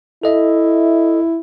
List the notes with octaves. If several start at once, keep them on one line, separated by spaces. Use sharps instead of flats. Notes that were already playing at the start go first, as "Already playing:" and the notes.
E4 A4 D#5 E5